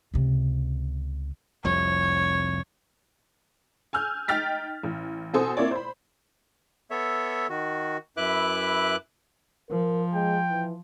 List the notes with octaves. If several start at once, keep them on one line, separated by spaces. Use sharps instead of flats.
C#2 C3
F1 C2 F2 C#5
G#5 E6 F6 G6
D#4 G5 F6 A6 B6
A1
B2 C4 A4 C5 G#5 D#6
A#3 C4 E4 C#5 D5
C5 B5
B3 A4 C#5 E5
D#3 F#4
F#2 E4 B4 E5 D6 F#6
F3 A#4
G#3 G5
E3